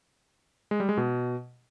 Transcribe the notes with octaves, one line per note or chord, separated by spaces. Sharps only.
G#3
G3
G#3
B2